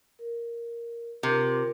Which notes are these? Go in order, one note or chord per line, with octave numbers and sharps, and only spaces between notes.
A#4
C3 F4 A#4